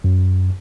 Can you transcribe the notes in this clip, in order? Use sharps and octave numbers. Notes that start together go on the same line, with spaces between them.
F#2